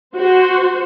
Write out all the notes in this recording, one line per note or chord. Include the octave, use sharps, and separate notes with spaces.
F#4 C5